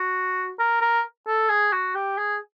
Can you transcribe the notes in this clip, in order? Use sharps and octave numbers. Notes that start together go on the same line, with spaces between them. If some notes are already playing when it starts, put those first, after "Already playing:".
Already playing: F#4
A#4
A#4
A4
G#4
F#4
G4
G#4